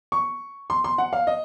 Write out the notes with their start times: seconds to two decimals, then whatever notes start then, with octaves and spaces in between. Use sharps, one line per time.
0.12 C#6
0.70 C6
0.84 C6
0.98 F#5
1.13 F5
1.27 D#5